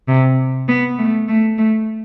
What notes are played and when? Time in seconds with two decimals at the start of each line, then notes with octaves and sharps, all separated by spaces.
0.09 C3
0.68 B3
0.99 A3
1.28 A3
1.58 A3